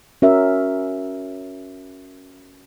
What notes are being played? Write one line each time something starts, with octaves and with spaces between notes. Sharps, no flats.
C#4 F#4 A#4 E5